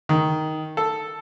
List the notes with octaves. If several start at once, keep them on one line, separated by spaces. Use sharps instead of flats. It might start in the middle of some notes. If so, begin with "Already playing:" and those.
D#3
A4